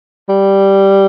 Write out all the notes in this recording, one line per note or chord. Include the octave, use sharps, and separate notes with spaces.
G3